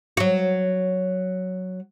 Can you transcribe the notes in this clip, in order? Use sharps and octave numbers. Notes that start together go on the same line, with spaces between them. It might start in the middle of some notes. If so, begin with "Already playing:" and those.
F#3 F#4